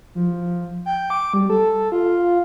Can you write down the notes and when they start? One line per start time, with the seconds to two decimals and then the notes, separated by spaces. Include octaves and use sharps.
0.15 F3
0.86 G5
1.10 D6
1.34 G3
1.50 A4
1.92 F4